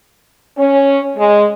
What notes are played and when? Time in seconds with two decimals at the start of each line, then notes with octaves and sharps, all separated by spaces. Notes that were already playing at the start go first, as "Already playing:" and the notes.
0.57 C#4
1.16 G#3